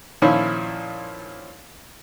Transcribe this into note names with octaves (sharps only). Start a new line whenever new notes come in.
A#2 D#3 F3 C#4 E4